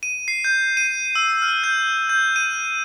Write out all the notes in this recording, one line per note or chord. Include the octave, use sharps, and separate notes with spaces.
D#7
C7
G6
D#7
E6
F6
G6
G6
D#7